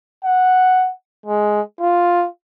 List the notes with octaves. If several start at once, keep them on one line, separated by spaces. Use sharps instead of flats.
F#5
G#3
F4